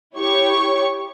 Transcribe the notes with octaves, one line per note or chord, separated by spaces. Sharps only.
E4 G4 C#5 C#6